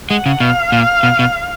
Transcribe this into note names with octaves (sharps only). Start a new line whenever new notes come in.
G#3 F#5
C#3
B2 F5
A#2
B2
B2